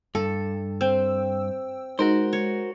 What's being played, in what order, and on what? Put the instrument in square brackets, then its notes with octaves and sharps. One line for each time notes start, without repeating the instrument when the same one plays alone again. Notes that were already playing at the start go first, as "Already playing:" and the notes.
[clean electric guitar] G2 [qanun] A4
[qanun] C4 [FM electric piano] G5 E6
[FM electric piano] G#3 D#4 [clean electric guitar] F#4 A#4 C5
[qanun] C#5